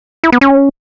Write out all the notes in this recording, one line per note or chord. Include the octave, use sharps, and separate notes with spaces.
E4
B3
C#4